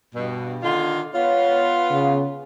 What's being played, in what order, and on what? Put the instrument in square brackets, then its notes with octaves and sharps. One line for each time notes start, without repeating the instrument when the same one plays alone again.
[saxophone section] G2 B2
D3 D#3 F4
[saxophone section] B3 F4 [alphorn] C#5
[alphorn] C#3